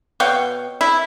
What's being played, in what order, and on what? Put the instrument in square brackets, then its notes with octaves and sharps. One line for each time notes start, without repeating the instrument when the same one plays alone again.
[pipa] B2 C#5 F5 G5
E4